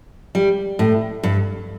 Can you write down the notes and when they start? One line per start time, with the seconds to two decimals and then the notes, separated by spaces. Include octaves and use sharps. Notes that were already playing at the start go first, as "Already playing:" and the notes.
0.35 G3
0.79 A2
1.23 G2